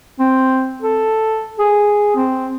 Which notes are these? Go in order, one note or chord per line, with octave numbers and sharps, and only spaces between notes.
C4
A4
G#4
C4